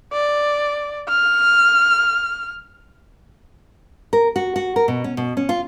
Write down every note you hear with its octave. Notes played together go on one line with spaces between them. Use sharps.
D5
F6
A#4
F#4
F#4
A#4
B2
C#4
B2
C#4
F4